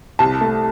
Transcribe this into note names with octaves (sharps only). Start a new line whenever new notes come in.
C2 A5
A3